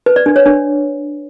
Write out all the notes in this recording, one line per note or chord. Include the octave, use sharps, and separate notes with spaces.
B4
D5
D4
C#5
D4